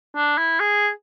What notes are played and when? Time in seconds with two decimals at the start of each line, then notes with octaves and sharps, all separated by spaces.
0.16 D4
0.38 E4
0.60 G#4